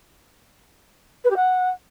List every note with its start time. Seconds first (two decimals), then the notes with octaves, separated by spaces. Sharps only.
1.24 B4
1.30 G4
1.36 F#5